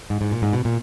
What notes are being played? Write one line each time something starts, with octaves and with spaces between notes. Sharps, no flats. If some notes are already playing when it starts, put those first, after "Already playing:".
G#2
G#2
A#2
G#2
B2
A#2